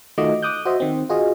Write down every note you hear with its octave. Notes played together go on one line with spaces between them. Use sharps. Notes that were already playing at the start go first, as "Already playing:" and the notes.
D#3 A3 F4 F#4 D#5 D6
D6 D#6 F#6 G6
F#4 C5 D#5 E5
D#3 C4
F4 F#4 G#4 D#5